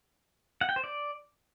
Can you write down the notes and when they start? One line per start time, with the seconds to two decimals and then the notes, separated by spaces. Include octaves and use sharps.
0.61 F#5
0.69 G5
0.76 C5
0.84 D5